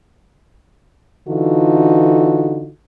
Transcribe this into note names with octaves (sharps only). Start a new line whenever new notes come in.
D3 E3 D#4 F4 F#4 A4